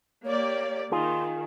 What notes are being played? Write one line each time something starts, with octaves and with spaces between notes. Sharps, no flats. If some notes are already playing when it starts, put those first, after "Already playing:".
A#3 G4 C#5 D5
D#3 F4 G#4 C6